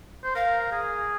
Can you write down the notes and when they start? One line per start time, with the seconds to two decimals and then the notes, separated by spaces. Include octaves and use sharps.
0.24 C5
0.35 A#4 F5
0.72 G#4